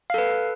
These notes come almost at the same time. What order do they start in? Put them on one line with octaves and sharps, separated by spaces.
F5 A4 B4